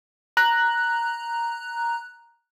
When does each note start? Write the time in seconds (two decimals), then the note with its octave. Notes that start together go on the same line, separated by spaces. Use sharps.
0.37 A#5 F#6